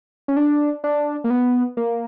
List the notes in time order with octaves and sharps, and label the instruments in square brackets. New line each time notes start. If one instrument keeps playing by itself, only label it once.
[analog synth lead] C#4
D4
D4
A#3
B3
A#3